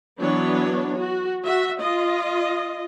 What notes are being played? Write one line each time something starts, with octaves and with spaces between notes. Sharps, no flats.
E3 F#3 B3 D4 C#5
F#4
F#4 E5
F4 D#5